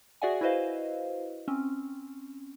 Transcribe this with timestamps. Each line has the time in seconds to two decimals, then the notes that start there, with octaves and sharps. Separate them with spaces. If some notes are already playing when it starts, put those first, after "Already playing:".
0.22 F#4 G#4 D5 E5 F#5 G#5
0.41 E4 F#4 B4 C5 D#5 F5
1.48 C4 C#4